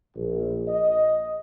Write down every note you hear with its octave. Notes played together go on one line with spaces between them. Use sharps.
A#1
D#5